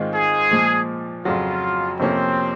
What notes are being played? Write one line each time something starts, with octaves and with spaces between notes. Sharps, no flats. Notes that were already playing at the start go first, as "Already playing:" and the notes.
Already playing: G#2 D#3 G#3 C4 F4
G#4
A#2 F3 G#3
F2 C#3 F#3 F4
F2 C3 F3 A#3 C4 C#4